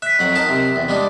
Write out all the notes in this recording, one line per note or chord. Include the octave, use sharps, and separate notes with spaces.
E5 F#6 B6
F2 F#3 F#5
D#4 A#4 A5
C3
E2
G3 G#3 D4